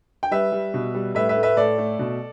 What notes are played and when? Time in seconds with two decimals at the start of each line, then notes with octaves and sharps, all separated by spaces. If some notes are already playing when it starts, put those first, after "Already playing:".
0.23 G5
0.31 G3 B4 E5
0.52 G3
0.74 B2
0.95 G3
1.15 A2 B4 E5
1.29 B4 E5
1.37 A3
1.43 B4 E5
1.57 A2 A4 D5
1.78 A3
1.99 B2